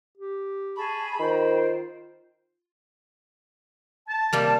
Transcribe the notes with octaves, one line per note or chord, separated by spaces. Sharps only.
G4
G#4 A5 B5 C#6
D#3 F4 C5 G5
A5
C3 G3 A#3